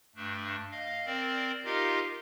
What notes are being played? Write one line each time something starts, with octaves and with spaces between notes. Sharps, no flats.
G2 A3 D4
D#5 F5
C4 A#4 D5
D#4 F4 G4 A#4 D#5 F5